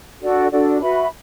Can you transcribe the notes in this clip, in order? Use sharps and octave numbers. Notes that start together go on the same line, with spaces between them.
D4 F#4 A4 D5
D4 F#4 A4 D5
F#4 B4 E5 B5